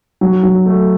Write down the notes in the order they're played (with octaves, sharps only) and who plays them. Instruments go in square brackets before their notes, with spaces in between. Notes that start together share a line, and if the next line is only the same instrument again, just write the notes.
[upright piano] F#3
F#3
A3